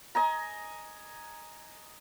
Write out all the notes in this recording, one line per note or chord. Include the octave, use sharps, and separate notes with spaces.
D#5 G#5 A#5